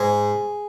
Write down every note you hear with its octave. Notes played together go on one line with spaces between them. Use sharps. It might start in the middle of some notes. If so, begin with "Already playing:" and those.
Already playing: G#2 G#4